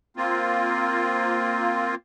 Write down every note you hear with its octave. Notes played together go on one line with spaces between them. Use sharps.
A#3 C4 F4